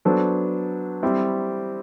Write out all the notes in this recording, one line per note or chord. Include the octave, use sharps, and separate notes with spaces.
F#3 B3 D4 A4 C5
G3 C4 E4